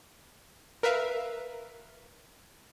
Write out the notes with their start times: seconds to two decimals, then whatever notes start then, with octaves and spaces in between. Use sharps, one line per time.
0.83 A#4 B4 E5 F5